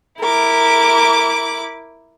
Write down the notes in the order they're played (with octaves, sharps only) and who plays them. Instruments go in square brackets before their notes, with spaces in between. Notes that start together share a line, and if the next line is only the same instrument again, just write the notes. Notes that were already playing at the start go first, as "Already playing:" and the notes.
[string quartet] E4 D6 [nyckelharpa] A#4